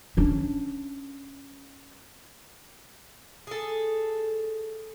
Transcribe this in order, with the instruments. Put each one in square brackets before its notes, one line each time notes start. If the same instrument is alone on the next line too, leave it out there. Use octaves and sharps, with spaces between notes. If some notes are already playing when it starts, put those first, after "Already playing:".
[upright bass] C#4 D4
[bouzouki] G#4 A4